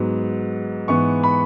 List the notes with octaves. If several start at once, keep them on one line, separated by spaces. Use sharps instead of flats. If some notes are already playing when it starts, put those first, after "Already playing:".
Already playing: G#2 F#3 B3
G#2 E3 B3 C#6
B5